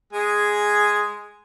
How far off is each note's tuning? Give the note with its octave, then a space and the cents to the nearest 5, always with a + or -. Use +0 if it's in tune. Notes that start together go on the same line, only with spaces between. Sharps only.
G#3 +0 G#4 +0